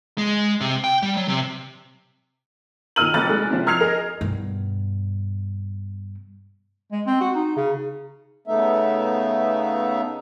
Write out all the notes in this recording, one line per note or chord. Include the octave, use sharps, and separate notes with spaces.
G#3
C3
G5
G3
F#3
C3
A#2 D#3 D#4 F6 D#7 F#7
F1 F2 F#6 A6
G#3
C3 F3
D#6 F6 G#6 C7 F7
G#4 A#4 D#5
G2 B2
G#3
C4
F#4
D#4
C#3
C#3 A3 B3 D#4 E5